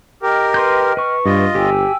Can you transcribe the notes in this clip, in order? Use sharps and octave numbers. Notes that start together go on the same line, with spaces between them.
G4 A#4 D#5 G5 F6
B4 C6 G6
B4 C#6
G2 F4 D#5
G1 G4 G5 G#5 E6